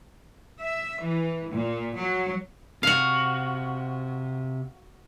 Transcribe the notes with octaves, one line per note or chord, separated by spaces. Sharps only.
E5
E3
A#2
F#3
C3 F#4 F5